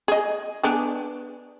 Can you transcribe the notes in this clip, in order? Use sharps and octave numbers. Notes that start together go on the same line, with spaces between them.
G#4 D#5
B3 D4 G#4